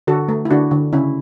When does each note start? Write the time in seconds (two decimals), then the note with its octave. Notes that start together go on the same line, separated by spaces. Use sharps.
0.07 D3 F#4 A4
0.28 A3
0.45 E4
0.50 D3 D4 F#4
0.71 D3
0.93 C#3 C#4 E4